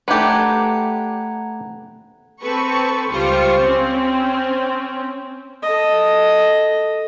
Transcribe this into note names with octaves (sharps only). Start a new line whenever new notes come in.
A3 D4 G4 B4 F#5 A#5 G#6
C4 A4 B4 C#6
C#2 G3 F4 C5 C#6
C4 C#4
A4 D#5